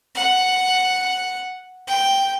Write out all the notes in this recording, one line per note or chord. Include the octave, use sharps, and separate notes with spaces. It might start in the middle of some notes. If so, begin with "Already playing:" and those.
F#5
G5